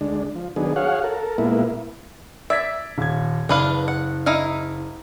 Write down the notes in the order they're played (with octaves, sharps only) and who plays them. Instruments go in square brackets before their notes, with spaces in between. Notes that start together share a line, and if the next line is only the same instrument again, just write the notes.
[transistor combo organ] D2 G#3 D4
F3
D#3 F#3 B3 D4 G#4
F#4 G#4 C#5 F5 F#5
A4 A#4
A#2 G#3 A#3 B3 E4
[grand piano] D5 G#6 B6 [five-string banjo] E5
[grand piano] D#1 G#6
[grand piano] F#1 [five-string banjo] D4 B4 F5
[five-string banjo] F#5
D#4 E4 F5